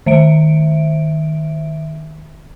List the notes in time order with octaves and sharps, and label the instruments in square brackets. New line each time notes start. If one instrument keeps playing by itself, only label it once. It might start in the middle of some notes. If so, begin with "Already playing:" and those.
[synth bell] D#3 E5 D7